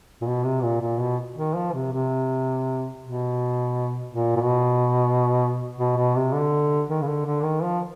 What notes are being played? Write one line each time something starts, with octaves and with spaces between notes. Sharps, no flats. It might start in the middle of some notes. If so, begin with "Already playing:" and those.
A#2
B2
C3
A#2
A#2
B2
D#3
F3
C3
C3
B2
A#2
A#2
B2
B2
B2
C3
D3
D#3
C#3
D3
D3
D#3
F3